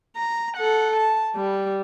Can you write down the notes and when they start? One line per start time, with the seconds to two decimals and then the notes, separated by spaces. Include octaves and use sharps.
0.16 A#5
0.57 A4 F#5
0.96 A5
1.35 G3